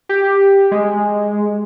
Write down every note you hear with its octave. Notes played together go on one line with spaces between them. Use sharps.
G4
G#3